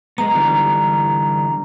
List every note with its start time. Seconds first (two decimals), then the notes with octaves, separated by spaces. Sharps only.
0.18 G#3 B3 A#5
0.35 D3 E3 G3